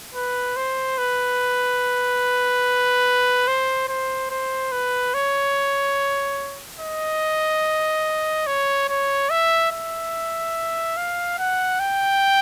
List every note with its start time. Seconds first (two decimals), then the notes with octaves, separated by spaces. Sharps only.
0.14 B4
0.57 C5
0.98 B4
3.48 C5
3.89 C5
4.31 C5
4.72 B4
5.14 C#5
6.81 D#5
8.47 C#5
8.89 C#5
9.30 E5
9.72 E5
10.97 F5
11.38 F#5
11.80 G5